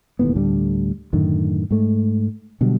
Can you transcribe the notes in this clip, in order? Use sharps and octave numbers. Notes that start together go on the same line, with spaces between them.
E1 D#2 A2 B3
D2 A2 D3 G3
F#2 A2 D3 D#3
G#2 A3
B2 D3 F#3 G3